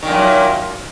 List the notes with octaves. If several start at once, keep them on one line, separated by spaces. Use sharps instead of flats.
F#2 A#2 D#3